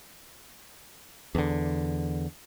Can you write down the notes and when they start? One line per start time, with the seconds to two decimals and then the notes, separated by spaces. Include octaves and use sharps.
1.35 E2 D3